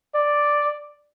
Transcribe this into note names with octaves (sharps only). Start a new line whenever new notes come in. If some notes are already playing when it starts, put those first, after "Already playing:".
D5